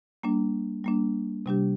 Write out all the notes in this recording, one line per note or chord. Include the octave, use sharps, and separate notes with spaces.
G3 A#3 D4
G3 A#3 D4
C3 G3 D4 G4